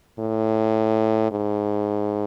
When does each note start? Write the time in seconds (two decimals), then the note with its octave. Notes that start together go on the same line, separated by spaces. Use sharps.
0.19 A2
1.32 G#2